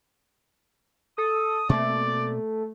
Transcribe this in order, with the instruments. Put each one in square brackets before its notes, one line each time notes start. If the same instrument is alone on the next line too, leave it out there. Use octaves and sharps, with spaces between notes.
[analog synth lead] A4 [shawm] D#6
[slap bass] B2 A#3 C4 [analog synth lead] A3 [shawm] D5